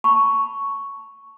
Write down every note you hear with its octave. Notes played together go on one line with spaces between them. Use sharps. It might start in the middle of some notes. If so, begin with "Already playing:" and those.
A5 B5 C#6